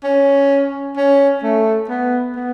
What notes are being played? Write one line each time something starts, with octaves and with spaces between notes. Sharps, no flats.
C#4
C#4
A3
B3
B3